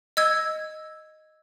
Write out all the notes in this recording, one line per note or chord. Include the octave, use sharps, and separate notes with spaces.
D#5 E6 G#6